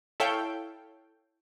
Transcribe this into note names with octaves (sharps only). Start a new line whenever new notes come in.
E4 A4 C#5 F5 G5